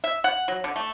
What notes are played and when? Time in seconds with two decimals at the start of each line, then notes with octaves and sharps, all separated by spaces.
0.04 E5
0.24 F#5
0.48 F#3
0.64 D3
0.76 A3